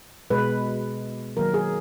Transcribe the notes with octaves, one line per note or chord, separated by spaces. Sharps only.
B2 G#3 B4
D#3 F#3 A#3 A#4
G#4